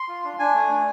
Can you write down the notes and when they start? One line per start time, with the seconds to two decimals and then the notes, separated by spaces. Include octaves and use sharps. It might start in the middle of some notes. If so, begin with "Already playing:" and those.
Already playing: C6
0.08 F4
0.24 D4
0.39 D4 G#5
0.55 A3
0.70 D4